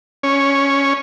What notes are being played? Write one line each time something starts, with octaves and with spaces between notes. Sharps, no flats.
C#4